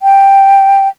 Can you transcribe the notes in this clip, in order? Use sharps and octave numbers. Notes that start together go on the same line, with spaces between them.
G5